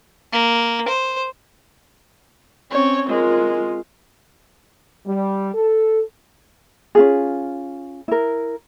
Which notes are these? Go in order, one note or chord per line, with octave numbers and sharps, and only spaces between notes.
A#3
C5
C4 C#4 C#5
G#3 F4 A#4
G3
A4
C#4 F4 G#4
E4 A#4